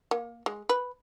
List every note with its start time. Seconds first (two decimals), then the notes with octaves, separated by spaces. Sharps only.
0.11 A#3
0.46 G#3
0.69 B4